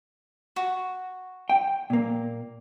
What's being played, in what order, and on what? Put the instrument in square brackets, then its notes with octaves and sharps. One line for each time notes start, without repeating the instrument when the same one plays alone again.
[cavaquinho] F#4
[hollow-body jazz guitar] G5
A#2 A#3